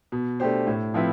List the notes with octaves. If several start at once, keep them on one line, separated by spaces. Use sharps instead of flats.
B2
A3 D4 G4 C5
A2
F3 C4 E4 B4